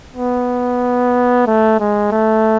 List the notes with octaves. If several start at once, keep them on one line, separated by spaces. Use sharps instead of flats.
B3
A3
G#3
A3